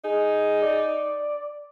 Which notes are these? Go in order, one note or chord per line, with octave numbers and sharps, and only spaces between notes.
D#4 G#4
D5